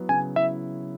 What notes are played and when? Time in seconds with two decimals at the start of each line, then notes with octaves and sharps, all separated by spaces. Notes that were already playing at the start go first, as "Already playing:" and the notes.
Already playing: F#3 B3 E4
0.09 C#3 G#5
0.36 E4 E5